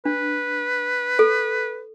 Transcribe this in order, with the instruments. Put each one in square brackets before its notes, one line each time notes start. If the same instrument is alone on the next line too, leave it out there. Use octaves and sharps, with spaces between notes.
[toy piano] D4 [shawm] B4
[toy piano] A4